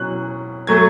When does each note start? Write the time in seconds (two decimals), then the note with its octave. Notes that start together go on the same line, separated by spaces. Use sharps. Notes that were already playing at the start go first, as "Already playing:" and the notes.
Already playing: B2 F#3 C#4 E4 F#6
0.67 F#3 A3 G#6